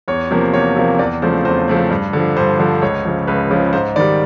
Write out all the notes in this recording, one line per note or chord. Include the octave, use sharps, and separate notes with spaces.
E2 C#5
C3 F3 A#3
E2 C#5
C3 F3 A#3
E2 D5
C#3 F3 A3 C4 C5
E2 C5
C#3 F3 A3 C4
G2
D3 F3
G2 C5
D3 F3
C#2 C#5
C#3 F3
C#2 B4
C#3 F3
G#2 C5
D#3 G3 D5